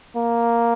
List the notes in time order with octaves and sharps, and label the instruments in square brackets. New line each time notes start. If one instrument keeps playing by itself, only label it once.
[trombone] A#3